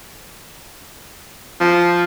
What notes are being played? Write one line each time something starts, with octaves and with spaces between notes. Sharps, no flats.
F3